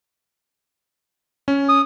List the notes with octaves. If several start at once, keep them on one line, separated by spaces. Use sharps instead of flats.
C#4
D#6